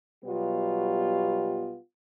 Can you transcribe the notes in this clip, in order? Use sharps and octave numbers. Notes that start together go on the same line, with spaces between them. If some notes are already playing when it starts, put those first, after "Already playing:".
B2 F#3 G3 B3 F4 G4